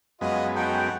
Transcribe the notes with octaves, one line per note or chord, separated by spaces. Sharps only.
F#2 G#3 B3 F4 F#4 D#5
D#4 F#4 A4 G5